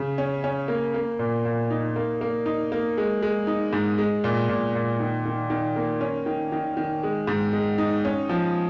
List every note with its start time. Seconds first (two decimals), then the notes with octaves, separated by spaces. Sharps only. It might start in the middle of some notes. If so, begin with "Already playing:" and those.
Already playing: C#3
0.18 C#4
0.44 C#4
0.68 A#3
0.94 A#3
1.19 A#2
1.45 A#2
1.70 D#4
1.96 A#3
2.21 A#3
2.46 D#4
2.72 A#3
2.97 G#3
3.22 G#3
3.47 D#4
3.73 G#2
3.98 G#3
4.24 A#2
4.49 A#2
4.75 A#2
5.00 D#3
5.25 D#3
5.50 D#3
5.76 A#3
6.01 C#4
6.26 D#3
6.52 D#3
6.77 D#3
7.03 G#3
7.27 G#2
7.53 G#3
7.78 D#4
8.05 C#4
8.29 F3